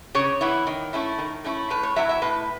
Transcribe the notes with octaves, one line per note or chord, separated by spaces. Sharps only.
C#3 C#5
E3 B3 E4
D#3
A3 C#4 E4
D#3
A3 C#4 E4
A2 B4
C#5
F#3 B3 E4 E5
E5
A2 B4